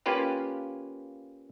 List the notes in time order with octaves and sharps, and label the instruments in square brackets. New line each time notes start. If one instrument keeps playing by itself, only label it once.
[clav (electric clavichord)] A#3 C#4 F4 G4 B4 F5